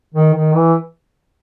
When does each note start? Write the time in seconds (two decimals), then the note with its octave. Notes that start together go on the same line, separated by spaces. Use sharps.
0.15 D#3
0.34 D#3
0.55 E3